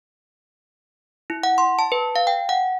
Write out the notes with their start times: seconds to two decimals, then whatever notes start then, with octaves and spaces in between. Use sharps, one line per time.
1.30 E4
1.43 F#5
1.58 C6
1.79 A5
1.92 B4
2.16 F5
2.27 G5
2.49 F#5